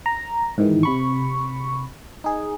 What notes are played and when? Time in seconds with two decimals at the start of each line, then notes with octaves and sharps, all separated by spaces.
0.06 A#5
0.58 G#2 D#3 E3
0.83 C3 B5 C#6
2.24 D#4 G#4